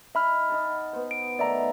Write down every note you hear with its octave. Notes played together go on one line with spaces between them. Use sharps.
D#4 E5 B5 F6
D#5 F#5 A5
B3 C5
D7
D#3 A3 D5 E5 A#5